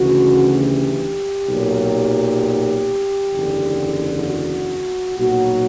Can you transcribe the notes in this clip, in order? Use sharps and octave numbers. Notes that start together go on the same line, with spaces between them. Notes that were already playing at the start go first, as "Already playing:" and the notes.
Already playing: D2 C#3 E3 F#4
G4
B1 A#2 F#3
F#1 E2 D3
F#4
B1 A#2 F#3 F#4